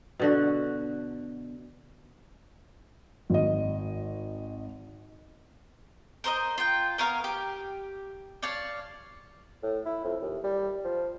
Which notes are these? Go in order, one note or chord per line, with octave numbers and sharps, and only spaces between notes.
B2 D3 F#4
G#1 D#5
A#4 C5 C#5 D#5
F4 G5
B3 A#4 C#5 F5
G4
C#5 D5 F5 A5
A2
E4
F2
D#2
G3
F3